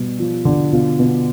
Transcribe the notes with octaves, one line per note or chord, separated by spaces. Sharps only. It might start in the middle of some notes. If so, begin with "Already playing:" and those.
Already playing: B2 G3
F3
D3
B2 F4
B2